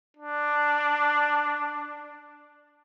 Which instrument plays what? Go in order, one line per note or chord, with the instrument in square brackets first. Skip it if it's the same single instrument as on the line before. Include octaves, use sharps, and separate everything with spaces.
[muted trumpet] D4